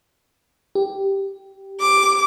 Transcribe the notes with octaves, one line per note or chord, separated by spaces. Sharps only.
G4
D6